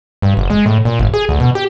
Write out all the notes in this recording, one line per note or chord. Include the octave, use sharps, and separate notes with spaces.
G2
F#1
G#3
A2
A#2
G1
G#4
D2
B2
G4